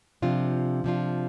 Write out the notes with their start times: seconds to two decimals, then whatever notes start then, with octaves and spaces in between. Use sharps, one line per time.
0.22 C3 F3 D4 F4
0.84 C3 F3 D4 F4